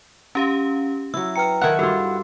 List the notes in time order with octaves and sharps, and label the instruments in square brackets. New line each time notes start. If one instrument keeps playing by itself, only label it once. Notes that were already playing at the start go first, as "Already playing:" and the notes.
[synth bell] C#4 G4 F5 [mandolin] A#5
[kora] F#3 E4 [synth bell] E6
[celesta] B4 G5 A#5 [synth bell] F6 C#7
[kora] D#3 A4 E5 [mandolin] E4 F#5
[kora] G2 F4 [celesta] F#4 E6 [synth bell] A4